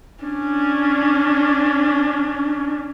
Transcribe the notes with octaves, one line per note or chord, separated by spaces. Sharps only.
C#4 D4